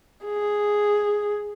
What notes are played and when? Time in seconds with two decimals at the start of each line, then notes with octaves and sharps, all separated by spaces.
0.25 G#4